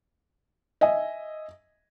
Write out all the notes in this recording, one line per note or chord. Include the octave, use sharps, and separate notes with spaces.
D#5 E5 G#5